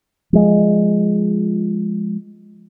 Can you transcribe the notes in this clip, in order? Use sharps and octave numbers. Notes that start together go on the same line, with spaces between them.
F3 G#3